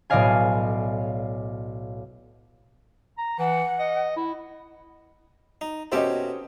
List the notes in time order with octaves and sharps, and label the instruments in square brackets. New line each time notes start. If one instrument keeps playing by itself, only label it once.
[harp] B1 A2 D5 D#5 F5 G#5
[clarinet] A#5
[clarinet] E3 [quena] F#5
[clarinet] D#5
E4
[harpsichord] D#4
[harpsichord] B2 E5 [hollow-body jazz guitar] C#4 G4 A4 [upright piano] C5 D#5